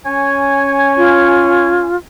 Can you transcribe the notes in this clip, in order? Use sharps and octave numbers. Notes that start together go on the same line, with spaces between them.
C#4 C#5 G#5
F4